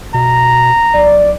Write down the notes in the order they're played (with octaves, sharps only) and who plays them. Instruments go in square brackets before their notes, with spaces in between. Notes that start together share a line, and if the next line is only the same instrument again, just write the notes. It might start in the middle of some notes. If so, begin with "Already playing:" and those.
[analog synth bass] B2 [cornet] A#5
[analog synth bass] B1 [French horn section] D5